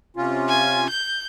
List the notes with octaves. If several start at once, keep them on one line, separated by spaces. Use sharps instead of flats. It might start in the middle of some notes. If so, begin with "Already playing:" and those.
C3 C#4 F4
G#5
G6